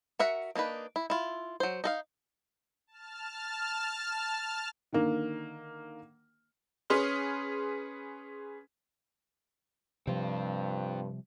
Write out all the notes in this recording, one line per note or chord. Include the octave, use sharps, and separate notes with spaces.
F#4 A#4 E5 F#5
A#3 D4 D#4 B4
E4
E4 F4
F#3 C5
D#4 A4 F5
A5 F6
D3 D#3 A#3
C#4 G#4 B4 C6 F6
G2 C3 F3 G3 C4 F4